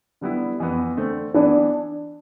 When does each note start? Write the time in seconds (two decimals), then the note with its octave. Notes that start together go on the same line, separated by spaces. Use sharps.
0.21 D3 G3 B3 E4
0.60 F2 E3 B3
0.97 D3 A3 C4
1.34 E3 B3 D4 E4